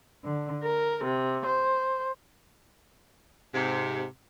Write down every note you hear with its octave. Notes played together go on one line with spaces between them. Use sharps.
D3
A#4
C3
C5
G#2 C3